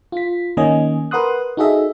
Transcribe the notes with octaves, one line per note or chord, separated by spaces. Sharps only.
F4 B6
D#3 A#3 C#4 D#5 G#5
A#4 B4 F#5 C6 D#6 F#6
D#4 F#4 G#4 A4 D#5 E5